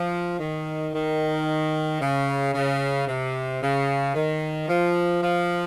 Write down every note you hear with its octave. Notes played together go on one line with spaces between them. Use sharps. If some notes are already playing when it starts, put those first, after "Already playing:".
Already playing: F3
D#3
D#3
C#3
C#3
C3
C#3
D#3
F3
F3